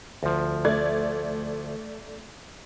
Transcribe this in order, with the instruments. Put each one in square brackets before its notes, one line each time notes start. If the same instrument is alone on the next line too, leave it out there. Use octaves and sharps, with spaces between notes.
[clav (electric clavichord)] D2 F3
[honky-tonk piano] A3 D5 G#6